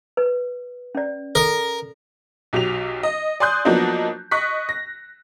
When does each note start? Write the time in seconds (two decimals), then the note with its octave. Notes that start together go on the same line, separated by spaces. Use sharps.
0.17 B4
0.95 C#4 D5
1.35 A4 A#4
2.53 B1 F#3 G4 F7
3.03 D#5
3.40 D5 G#5 C6 D#6 F#6 G6
3.65 F3 F#3 A#3 B3 D4 D#4
4.31 D#5 C#6 F#6 B6
4.69 A#6